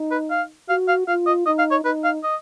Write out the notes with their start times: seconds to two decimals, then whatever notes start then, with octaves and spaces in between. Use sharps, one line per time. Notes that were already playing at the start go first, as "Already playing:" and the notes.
Already playing: D#4
0.11 B4
0.31 F5
0.69 F#4 F5
0.88 F5
1.08 F4 F5
1.27 D#5
1.46 D#4 D#5
1.59 F5
1.71 C#5
1.84 D#4 B4
2.04 F5
2.24 D#5